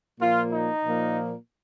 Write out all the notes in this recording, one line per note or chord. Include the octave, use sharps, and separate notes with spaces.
A#2 F3 A#3 F4
D#4
A#2 F3 A#3